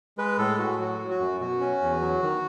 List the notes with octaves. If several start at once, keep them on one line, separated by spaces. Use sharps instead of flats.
G#3 B4
A2 A4
A2 F#4
F#3 F#4
F#3
F#4
F#2
B2 F#4
C#4
E2
F#3
D#3